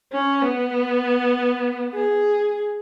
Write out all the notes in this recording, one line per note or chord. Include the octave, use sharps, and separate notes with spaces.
C#4
B3
G#4